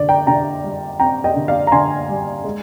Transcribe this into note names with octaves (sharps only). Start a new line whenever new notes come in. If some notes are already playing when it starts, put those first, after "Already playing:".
Already playing: D3 D5
G5 A#5
D3 G5 A#5
G3
C4 G5 A#5
D#5 G5
D3
D5 F5
A#5
D3 G#5 C6
G3
G#3